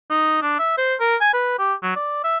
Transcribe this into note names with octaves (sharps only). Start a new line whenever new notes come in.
D#4
D4
E5
C5
A#4
G#5
B4
G4
F#3
D5
E5